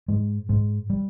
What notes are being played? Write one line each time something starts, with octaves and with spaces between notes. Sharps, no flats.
G#2 G#3
G#2 G#3
G3